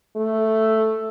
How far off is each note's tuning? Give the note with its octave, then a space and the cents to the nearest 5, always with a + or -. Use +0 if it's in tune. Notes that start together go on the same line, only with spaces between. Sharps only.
A3 +0